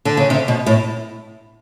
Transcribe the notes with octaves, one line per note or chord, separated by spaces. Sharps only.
D3
C#3
C3
B2
A2